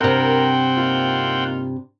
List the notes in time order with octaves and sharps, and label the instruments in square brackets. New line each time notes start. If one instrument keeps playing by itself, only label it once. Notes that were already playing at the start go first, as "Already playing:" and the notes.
[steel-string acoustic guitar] G2 C3 [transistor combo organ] C4 F#5 G5 [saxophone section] A#4
[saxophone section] A#3 D#4 F4